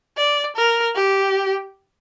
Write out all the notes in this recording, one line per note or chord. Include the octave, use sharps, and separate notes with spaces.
D5
A#4
G4